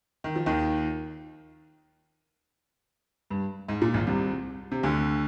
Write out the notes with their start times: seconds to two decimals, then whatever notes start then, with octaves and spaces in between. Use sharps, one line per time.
0.24 D#3
0.35 F3
0.46 D#2 D#3
3.30 G2
3.68 G#2
3.82 A#2
3.94 G#1 G#2
4.07 C2 C3
4.72 C3
4.83 D2 D3